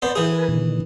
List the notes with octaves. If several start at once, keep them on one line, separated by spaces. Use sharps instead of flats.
B3 C5 D5 A5 C6
E3 G#4 A#4 G5
A#4 B4 G#5
A#2 D3 D#3